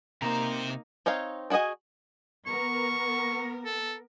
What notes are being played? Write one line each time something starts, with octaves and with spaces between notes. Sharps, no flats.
C3 A#3 D#4 C5 A#5
C4 D#4 C#5 F5
D4 F#4 G#4 D#5 G#5
B3 A#4 C#6
A4